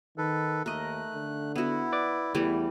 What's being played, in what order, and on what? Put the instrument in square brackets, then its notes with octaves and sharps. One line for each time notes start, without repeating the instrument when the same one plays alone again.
[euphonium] D#3 [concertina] A4 B4
[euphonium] D#2 [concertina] A3 F#6 [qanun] A#4 D#5
[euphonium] D3
[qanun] B3 F#4 [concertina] E4
[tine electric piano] B4 D5 D6
[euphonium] E2 [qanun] E3 G3 A3